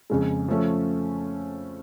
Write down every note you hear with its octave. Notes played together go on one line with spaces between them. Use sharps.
F2 C#3 G#3
F3 A3 C#4